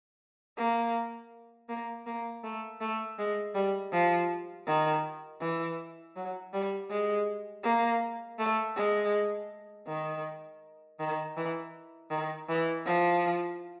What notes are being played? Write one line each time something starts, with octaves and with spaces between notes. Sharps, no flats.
A#3
A#3
A#3
A3
A3
G#3
G3
F3
D#3
E3
F#3
G3
G#3
A#3
A3
G#3
D#3
D#3
E3
D#3
E3
F3